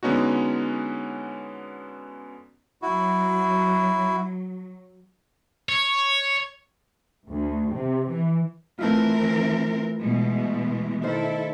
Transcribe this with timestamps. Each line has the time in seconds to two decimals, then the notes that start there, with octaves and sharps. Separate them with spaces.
0.03 D3 G#3 B3 C#4 D#4 F#4
2.82 F#3 E4 F#4
5.69 C#5
7.29 D2
7.72 C3
8.09 E3
8.79 E3 A3 C4 E4 F4 A#4
9.99 B2 E3 G#3
11.03 D#3 E4 A4 C5